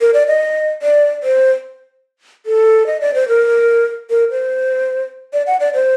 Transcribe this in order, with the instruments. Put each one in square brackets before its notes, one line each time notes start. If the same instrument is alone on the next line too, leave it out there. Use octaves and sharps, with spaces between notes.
[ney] A#4
D5
D#5
D5
C5
A4
D#5
D5
C5
A#4
A#4
C5
D5
F#5
D5
C5